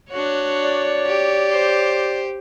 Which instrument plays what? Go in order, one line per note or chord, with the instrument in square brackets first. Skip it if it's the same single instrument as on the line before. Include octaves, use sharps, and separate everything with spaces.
[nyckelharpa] D4 F#4 [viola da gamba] C#5
[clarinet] D5
[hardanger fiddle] G4
[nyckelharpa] C5